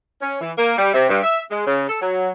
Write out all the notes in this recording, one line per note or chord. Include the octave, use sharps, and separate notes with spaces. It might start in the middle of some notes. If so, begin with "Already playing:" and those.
C#4
E3
A#3
G3
C3
G2
E5
G#3
C#3
A4
F#3